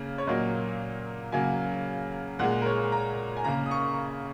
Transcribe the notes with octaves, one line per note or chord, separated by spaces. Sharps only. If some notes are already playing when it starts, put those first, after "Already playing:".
Already playing: C#3 A#3
C#5
A#2 F#3 A#3 D#5
C#3 F#3 A#3 G#5
A#2 G#3 F#5
A#4
C#5
A#5
G#5
C#3 A#3 A#5
D#6
C#6